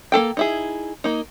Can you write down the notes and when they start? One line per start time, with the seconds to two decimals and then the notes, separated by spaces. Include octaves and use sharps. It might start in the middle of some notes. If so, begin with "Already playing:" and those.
0.12 A#3 G#4 A4 G5
0.37 D#4 E4 G#4
1.04 A#3 D#4